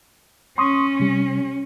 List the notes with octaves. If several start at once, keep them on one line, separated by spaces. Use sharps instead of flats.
C#4 C6 C#6 D#6
C3 G3